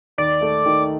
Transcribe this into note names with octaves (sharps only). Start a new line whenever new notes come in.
D#2 D5
A3
D#3